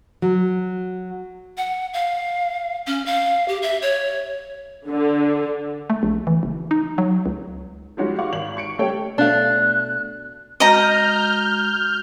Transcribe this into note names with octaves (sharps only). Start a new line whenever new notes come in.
F#3
F#5
F5
C#4
F5
G4
E5
C#5
D3
A3
A#1
E3
F#1
D#4
F#3
C#2
F3 G3 G#3 C#4 D#4 F#4
F5 F#5 C#6 D6
G#1 F#7
C#6 C#7 D7
G3 A3 C#4 A4 C#5 G5
B2 A3 D4 F5 F#6
G#3 F#4 D#5 A#5 F6 G6